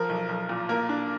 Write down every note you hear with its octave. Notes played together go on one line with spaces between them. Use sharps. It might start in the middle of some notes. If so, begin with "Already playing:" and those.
Already playing: F3 A#4
B1
B1
A#2
A#3 A#4
D4